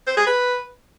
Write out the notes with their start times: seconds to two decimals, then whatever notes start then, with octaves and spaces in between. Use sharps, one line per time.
0.07 C5
0.17 G#4
0.26 B4